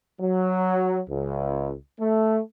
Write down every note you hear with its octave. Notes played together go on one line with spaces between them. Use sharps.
F#3
C#2
A3